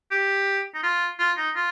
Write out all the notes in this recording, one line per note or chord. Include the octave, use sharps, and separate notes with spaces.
G4
D#4
F4
F4
D#4
F4